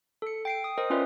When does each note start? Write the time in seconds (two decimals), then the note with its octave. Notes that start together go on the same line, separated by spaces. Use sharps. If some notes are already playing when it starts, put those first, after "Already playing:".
0.22 A4 C#7
0.45 G5 C7 D7
0.64 D#6
0.78 A#4 C5 D#5 D#6
0.90 C#4 F4 B4 D5 E5